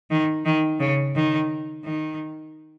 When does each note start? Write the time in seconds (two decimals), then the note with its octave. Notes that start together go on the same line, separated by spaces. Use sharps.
0.11 D#3
0.45 D#3
0.80 C#3
1.15 D#3
1.85 D#3